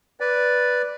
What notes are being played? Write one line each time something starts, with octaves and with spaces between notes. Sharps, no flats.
B4 D5